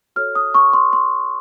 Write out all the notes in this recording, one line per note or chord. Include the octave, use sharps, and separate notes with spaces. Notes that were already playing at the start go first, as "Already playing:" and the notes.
F#4 A4 C#5 F6
D#6
C#6
C6
C6